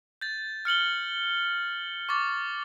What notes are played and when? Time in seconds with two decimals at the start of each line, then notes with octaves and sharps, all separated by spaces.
0.21 G6 A6
0.65 F6 C#7 F#7 G7
2.09 C#6 D6 A6